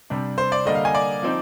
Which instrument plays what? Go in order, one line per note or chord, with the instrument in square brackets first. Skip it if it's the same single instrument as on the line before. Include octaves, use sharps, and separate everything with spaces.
[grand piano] C3 G3 D4
C5
D5
D3 G3 A#3 D#5
F5
G#5
D5
F3 C4 D#4